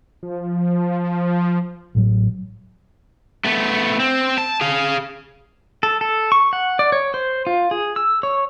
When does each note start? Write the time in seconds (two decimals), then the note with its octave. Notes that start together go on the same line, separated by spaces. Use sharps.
0.23 F3
1.95 A1 A2 F#3
3.45 A3 B3
4.00 C4
4.38 A5
4.61 G#4 F5
5.83 A4
6.01 A4
6.32 C#6
6.53 F#5
6.79 D5
6.92 C#5
7.14 C5
7.47 F4
7.71 G#4
7.96 E6
8.23 C#5